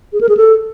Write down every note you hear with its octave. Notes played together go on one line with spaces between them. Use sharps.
G#4
A#4
G#4
A4